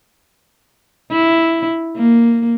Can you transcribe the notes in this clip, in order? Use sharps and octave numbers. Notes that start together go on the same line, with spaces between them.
E4
A#3